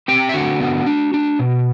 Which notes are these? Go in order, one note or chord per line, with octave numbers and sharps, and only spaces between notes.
C4 G4 G5
E5
D3 F#4 F#5
B3
D4
D4
B2